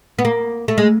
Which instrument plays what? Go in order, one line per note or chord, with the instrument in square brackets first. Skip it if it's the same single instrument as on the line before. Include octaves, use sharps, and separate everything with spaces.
[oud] B3
A#3
A3
G#3